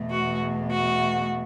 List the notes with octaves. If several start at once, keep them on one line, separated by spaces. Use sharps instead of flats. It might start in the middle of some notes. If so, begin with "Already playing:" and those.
Already playing: E2 B2 A3
F#4
F#4